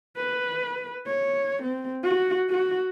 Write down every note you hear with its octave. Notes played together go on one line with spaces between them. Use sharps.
B4
C#5
C4
F#4
F#4